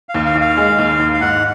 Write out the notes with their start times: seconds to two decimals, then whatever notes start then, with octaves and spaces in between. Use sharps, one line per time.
0.09 F5
0.14 D#2
0.25 F5
0.35 D#2
0.41 F5
0.57 G#3
0.79 D#2
0.99 D#2
1.13 F5
1.21 G#2 F#5